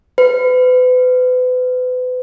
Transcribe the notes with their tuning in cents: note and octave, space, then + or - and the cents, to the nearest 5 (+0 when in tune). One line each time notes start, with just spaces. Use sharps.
B4 +35